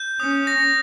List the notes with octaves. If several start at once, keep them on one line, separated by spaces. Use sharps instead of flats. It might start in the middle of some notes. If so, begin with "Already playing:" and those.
Already playing: G6
C#4 D#6
A#6